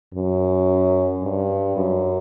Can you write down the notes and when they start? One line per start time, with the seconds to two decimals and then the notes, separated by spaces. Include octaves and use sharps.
0.14 F#2
1.22 G2
1.76 F#2